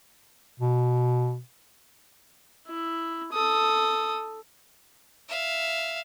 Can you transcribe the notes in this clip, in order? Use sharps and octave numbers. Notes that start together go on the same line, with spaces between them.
B2
E4
A4 D#6
E5 F5